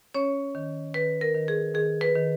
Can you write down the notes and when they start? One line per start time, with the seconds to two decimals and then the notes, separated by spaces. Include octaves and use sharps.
0.15 C#4 C#5
0.55 D#3
0.94 D#3 B4
1.21 A#4
1.35 D#3
1.48 G#4
1.74 D#3 G#4
2.01 B4
2.15 D#3